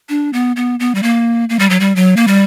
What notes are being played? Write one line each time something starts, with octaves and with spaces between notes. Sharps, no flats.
D4
B3
B3
B3
G3
A#3
A#3
G3
F#3
G3
F#3
A#3
G3